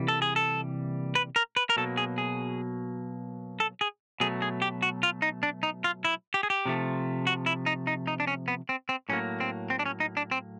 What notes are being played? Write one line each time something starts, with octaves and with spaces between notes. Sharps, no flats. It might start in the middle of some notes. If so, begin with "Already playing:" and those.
Already playing: C3 E3 G3 A#3
A4
G#4
A4
B4
A#4
B4
A#4
B2 F#3 A#3 A4
G#4
G#4
A4
G#4
B2 F#3 A3 G#4
G#4
G4
F#4
F4
D#4
D4
D#4
F4
E4
G4
G#4
G4
C3 F3 A3
F#4
E4
D#4
D#4
D#4
D4
C#4
B3
C4
C4
A2 F#3 A#3 C#4
C4
C4
D4
C#4
D#4
D4
C4